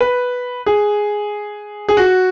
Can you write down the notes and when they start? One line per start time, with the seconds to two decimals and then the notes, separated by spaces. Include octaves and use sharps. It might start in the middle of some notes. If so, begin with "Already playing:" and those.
0.01 B4
0.66 G#4
1.89 G#4
1.97 F#4